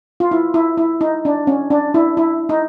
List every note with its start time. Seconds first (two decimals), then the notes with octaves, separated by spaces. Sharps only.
0.20 F4
0.31 E4
0.54 E4
0.77 E4
1.01 D#4
1.25 D4
1.47 C#4
1.70 D4
1.94 E4
2.17 E4
2.49 D#4